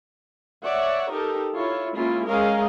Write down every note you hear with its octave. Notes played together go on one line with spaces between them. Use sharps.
C#5 D5 E5 F#5
D#4 G4 A4 A#4
E4 F4 C#5
G#3 A#3 C#4 E4 F4
G#3 C#4 G#4 A#4 D#5 F5